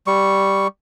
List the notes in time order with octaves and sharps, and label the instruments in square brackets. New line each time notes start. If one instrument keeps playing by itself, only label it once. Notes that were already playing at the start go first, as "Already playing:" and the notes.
[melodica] G3 C#6